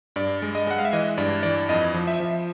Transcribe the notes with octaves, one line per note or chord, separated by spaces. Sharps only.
G2 D5
G#3
D#5
G#3 F#5
F5
E5
E3 D#5
G2 D5
E3 D5
F2 D#5
F3
E5
F3